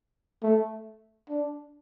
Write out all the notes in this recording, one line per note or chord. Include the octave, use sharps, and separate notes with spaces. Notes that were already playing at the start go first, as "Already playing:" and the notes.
A3
D4